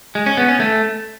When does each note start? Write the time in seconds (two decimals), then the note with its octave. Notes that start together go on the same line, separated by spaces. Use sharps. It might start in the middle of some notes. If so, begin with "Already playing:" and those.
0.15 G#3
0.26 C#4
0.37 B3
0.49 C#4
0.60 A3